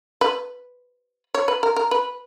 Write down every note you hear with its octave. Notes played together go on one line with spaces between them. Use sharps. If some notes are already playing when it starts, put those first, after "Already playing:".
B4
C#5
B4
A#4
A#4
B4